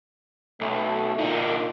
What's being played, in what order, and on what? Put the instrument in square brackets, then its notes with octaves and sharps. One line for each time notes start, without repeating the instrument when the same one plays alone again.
[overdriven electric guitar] B1 [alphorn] A3
[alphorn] A#2 [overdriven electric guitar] D3 D#4